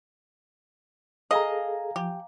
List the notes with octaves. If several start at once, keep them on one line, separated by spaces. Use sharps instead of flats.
G#4 A4 D#5 F5 G#5 A#5
F3 G4